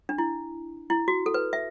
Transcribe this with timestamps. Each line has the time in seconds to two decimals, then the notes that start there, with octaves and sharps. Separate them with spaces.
0.09 D4
0.18 E4
0.90 E4
1.08 F#4
1.26 A4
1.34 B4
1.53 E5